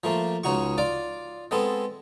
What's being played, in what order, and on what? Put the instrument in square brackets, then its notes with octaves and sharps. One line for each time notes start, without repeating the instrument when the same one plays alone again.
[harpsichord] F3 A3 A#3
C#2 C#3 D#4 F#4 C#6
F4 D5 D6
G#3 B3 C4 A4